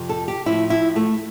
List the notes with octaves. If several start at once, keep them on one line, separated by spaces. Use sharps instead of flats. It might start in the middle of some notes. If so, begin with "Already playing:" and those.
Already playing: F2 C3 F3
A4
G4
A2 F3 E4
E4
A3